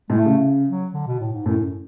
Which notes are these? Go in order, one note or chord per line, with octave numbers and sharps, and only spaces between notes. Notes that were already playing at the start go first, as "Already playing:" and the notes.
A2 G#3
A3
C#3
F#3
D3
B2
A2
G#2
F#2 A2
F#2